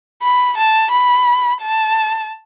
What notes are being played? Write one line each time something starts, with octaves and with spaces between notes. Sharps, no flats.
B5
A5
B5
A5